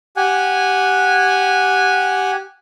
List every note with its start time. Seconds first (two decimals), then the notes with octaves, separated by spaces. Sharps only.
0.17 G4 F#5 G#5